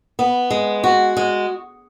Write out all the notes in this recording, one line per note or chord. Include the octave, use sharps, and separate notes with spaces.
B3
G#3
F#4
G#3